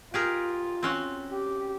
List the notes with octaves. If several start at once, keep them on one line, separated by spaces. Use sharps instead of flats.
F4 G4 G#4 A#4
C4 C#4 F#4
G4